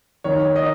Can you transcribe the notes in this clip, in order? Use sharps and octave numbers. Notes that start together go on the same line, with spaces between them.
D#3 C#5
D#5